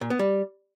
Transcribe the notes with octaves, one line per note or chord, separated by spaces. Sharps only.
A#2
B3
G3